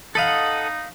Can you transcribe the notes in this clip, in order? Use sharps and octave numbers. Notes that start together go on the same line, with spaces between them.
D#4 A4 D#5 F5 F#5 B5